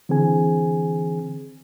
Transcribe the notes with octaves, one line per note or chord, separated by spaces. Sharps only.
D3 E3 C4 G#4 G#5